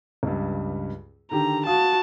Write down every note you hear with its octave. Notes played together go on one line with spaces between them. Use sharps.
C#2 G2
D3 D#3 G4 A#5
F#4 F5 A5 D#6